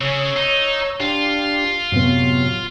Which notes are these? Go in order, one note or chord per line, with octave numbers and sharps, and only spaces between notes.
C#3 C#4 C#5 E6
D#4
D4 F4 G4
F#2 A2 C3 F#3 B3